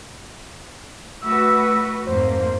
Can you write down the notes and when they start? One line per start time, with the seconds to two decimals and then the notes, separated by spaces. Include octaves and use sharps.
1.22 A3 F#4 B4 E6
2.07 F2 G#2 A#3 C5